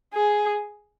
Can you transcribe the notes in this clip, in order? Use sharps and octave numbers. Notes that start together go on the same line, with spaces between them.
G#4